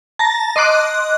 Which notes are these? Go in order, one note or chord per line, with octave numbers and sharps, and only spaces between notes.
A5 A#5 A#6
D#5 C6 D6 F#6